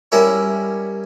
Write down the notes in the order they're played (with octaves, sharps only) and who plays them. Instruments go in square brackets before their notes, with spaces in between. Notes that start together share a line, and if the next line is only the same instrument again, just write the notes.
[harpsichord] G3 C#4 E4 A#4